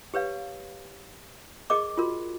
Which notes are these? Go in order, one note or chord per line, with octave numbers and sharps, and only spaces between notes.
G4 B4 C#5 F5
G#4 A#4 D#5 D6
F4 F#4 A#4